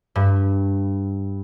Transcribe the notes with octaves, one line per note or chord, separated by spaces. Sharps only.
G2